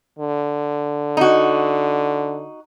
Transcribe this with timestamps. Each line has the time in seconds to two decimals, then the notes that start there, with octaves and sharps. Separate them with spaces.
0.19 D3
1.17 D#4 F#4